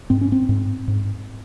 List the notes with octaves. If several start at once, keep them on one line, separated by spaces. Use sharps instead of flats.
G#2 C4
C#4
C4
G#2
G#2